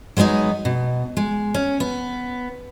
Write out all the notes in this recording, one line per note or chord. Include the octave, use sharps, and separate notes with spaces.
F#3 G#3 B3 D4 D#4
B2
G#3
C#4
B3